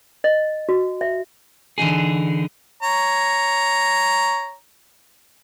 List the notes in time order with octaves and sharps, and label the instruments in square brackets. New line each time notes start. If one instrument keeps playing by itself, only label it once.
[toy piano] D#5
F#4
E5
[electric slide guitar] D3 E3 D#4 G#4
[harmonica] C#5 A#5